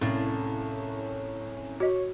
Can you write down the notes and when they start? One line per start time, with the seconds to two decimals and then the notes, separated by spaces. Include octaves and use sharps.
0.01 C2 A2 C#4 D5 F5
1.80 F#4 C#5 D#5